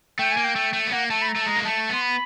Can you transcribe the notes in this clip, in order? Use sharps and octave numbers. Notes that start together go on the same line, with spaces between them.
A3 G5
G#5
A#3
G5
A3
A3
B3
A#3 F#5
A3 A5
B5
A#5
A3
A5
G#3 A#5
A#3
A3 A5
B3 C6
B5